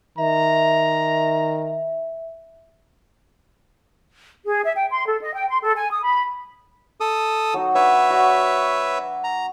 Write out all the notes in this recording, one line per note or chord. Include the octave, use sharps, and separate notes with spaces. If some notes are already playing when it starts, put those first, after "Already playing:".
D#3 E5 A#5
G#4
E5
G5
C6
A4
D#5
G5
C6
A4
G#5
D#6
B5
A4 D#6
F#3 D#4 F#4
D4 B4 C#5 E5
F#4 D5
A#5